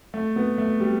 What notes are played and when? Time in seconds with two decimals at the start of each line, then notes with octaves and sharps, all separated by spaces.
0.14 A3
0.36 B3
0.58 A3
0.80 G3